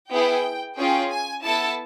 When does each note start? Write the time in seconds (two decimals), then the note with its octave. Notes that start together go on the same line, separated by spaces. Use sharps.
0.10 B3 E4 G#4 G5
0.78 C#4 F4 G#4 G5
1.11 G#5
1.44 B3 E4 A4 A5